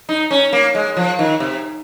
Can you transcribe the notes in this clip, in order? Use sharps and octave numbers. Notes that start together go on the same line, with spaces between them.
D#4
C#4
A#3
G#3
F3
D#3
C3